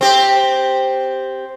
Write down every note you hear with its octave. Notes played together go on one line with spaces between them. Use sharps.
C4 G4